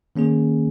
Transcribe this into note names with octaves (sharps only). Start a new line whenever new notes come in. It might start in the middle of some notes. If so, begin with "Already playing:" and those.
D#3 A#3 C#4 G#4